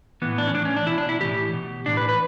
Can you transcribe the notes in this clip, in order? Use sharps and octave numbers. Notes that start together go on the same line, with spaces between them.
A2 E3 B3
D4
C#4
A2 E3 D4
C#4
D4
B2 E4
D4
E4
A2 E3 G4
B2
A2 E3 D4
B4
B4